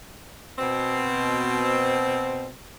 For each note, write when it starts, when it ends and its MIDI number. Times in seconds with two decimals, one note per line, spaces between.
0.58 2.49 47
0.58 2.49 60